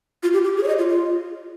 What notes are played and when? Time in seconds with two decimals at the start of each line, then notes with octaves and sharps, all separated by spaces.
0.23 F4
0.33 G4
0.44 G4
0.57 G#4
0.63 C#5
0.68 D#5
0.78 F4
0.89 F4